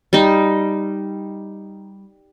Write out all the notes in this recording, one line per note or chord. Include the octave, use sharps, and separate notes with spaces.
G3 D#4